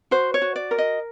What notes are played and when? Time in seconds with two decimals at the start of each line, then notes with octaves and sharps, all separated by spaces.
0.11 F#4 C5
0.34 C#5
0.42 F#4
0.56 D5
0.71 A#4
0.78 D#5